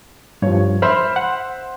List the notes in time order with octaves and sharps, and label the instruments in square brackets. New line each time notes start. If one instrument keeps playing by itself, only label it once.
[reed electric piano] G2 F3 [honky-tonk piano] C#5
[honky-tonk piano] C5 E5 C6 [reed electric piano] B5 F6
[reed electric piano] F#5